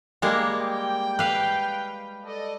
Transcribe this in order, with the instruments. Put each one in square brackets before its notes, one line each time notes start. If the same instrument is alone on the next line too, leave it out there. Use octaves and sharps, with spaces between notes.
[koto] G3 G#3 A#3
[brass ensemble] G5
[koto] B4 F5
[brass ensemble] A4 D5 D#5